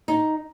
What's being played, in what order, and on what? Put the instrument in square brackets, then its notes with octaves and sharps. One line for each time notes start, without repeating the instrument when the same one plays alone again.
[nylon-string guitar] D#4